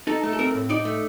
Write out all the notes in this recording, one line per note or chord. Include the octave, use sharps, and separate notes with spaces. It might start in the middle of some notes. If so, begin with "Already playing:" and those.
D#4 A4
A3
A4
C4 A#4
A2
D#4 D5
A3